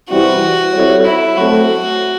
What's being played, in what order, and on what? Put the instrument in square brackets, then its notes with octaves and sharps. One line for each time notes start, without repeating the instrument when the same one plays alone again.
[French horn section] C3 E3 G3 C4 E4 [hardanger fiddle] F#4
[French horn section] G3 C4 E4 A4 C#5
[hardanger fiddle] E4
[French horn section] F#3 A3 C4 [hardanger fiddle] F#4